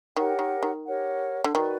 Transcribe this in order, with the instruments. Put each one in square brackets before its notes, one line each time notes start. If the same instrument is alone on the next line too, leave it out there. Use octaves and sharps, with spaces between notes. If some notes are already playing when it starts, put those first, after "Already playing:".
[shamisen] D#3 [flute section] G4 A#4 C#5 F#5
[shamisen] D#3
D#3
[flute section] G4 A#4 C#5 F#5
[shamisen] D3
[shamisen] D#3 [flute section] F#4 B4 D5